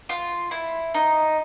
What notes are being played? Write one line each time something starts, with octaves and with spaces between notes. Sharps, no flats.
F4
E4
D#4